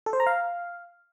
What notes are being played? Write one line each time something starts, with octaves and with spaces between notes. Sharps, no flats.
A4
C5
A#5
F5